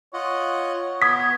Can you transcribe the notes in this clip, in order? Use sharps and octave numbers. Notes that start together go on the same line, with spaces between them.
F4 C#5 D#5 F#5
B3 D#6 G#6 B6